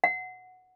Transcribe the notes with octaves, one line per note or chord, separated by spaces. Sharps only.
F#5